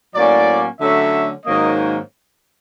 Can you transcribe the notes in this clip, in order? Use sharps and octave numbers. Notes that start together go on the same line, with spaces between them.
A2 F#3 A#3 C#4 D5
D3 F#3 A3 C#4 E5
G#2 D#3 F#3 A#3 C#4 D#5